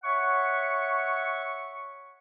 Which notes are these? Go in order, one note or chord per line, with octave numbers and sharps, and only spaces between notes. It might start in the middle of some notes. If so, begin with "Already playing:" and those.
C#5 E5 F#5 C#6